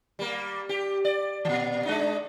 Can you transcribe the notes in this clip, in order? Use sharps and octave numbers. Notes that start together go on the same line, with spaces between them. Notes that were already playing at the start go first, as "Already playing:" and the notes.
G3 A#3
G4
D5
A#2 E3
G#3 D4 D#4